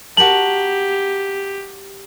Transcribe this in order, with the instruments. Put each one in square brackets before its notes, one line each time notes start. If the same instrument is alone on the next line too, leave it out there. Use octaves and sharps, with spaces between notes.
[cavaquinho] F#4 A#4 A5 [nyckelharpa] G4 [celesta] F#7